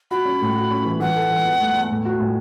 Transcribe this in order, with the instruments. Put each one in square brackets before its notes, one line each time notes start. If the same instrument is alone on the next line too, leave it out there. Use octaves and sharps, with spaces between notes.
[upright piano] F#4 [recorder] B5
[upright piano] C#4
A2
F#4
C#4
E3
[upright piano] E3 [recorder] F#5
[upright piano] A4
E3
E2
A3
E2
A2
F#4
A2